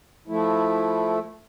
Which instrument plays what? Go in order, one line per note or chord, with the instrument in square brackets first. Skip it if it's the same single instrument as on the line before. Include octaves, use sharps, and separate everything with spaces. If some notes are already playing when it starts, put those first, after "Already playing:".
[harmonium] F3 A3 E4